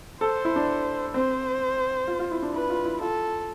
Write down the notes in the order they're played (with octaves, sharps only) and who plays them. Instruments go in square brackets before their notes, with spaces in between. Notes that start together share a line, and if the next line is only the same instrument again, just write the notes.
[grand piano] A4 [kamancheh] C5
[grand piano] E4
D4
[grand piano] C4 [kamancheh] C5
[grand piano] F4
F4
E4
D4
[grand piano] E4 [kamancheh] B4
[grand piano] F4
E4
[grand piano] F4 [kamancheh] A4